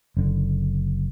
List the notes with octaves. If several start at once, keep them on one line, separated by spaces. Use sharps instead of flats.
F#1 D3